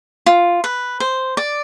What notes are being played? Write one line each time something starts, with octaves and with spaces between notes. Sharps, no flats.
F4
B4
C5
D5